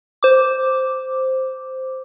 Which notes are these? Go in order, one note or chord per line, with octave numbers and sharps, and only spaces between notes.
C5 D6